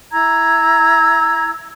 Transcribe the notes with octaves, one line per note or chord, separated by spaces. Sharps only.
E4 A#5 E6 G#6